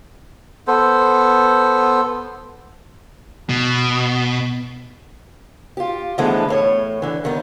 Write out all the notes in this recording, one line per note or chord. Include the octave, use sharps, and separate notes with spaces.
B3 A4 C5
B2
F4 G4
D3 E3 F3 G#3 A3 B3
E2 A2 C#5
D3 E3
D#2 D#3 G3 B3